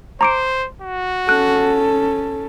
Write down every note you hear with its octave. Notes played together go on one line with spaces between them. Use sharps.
C5 A#5 D6 D7
F#4
C#4 A4 F#6